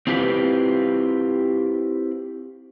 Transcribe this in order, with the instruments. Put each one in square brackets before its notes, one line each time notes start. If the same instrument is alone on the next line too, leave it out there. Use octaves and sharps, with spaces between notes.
[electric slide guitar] C4 E4 F4 G4 B4